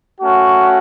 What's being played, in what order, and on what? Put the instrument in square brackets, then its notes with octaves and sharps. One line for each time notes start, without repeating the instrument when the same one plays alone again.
[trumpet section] A3 C#4 F#4